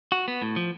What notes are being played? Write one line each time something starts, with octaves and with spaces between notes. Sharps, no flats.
F#4
B3
A2
F3